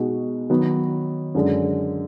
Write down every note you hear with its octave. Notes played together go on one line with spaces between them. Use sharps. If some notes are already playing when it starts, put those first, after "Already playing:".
Already playing: B2 G#3 D#4 F#4
D#3 F#3 B3
F#2 D3 G#3